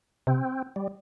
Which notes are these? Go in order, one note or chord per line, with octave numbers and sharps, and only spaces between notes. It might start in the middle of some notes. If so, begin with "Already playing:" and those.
C3 C4
G3